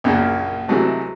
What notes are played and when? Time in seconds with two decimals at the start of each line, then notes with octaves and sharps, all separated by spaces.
0.04 A#1 F#2 A#2 C#3
0.68 C3 E3 F#3 G#3 A3